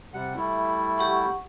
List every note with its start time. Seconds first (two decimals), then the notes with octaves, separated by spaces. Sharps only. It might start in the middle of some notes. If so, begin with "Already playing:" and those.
0.14 C3 G3 F#5
0.36 G3 A3 E4
0.98 G4 F#5 C#6